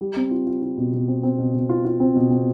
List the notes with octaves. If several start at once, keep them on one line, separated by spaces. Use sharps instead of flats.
G3
C4
F4
F4
F4
B2
B2
C4
C4
B2
B2
F4
F4
C4
B2
C4